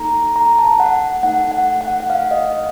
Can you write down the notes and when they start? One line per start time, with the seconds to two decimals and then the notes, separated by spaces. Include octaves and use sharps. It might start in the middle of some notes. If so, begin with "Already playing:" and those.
Already playing: A#3 D#4 A4 A#5
0.36 A#5
0.58 A5
0.80 F#5
1.23 A3 D#4 A4 F#5
1.52 F#5
1.81 F#5
2.00 F#5
2.10 F5
2.31 D#5